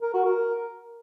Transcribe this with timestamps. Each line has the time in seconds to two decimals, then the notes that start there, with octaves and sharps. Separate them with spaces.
0.02 A#4
0.14 F#4
0.25 A#4